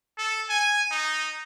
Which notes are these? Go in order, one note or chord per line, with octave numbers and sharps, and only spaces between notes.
A4
G#5
D#4